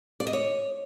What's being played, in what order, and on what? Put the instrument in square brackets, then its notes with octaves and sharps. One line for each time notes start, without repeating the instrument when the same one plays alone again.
[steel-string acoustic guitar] D5
D#5
C#5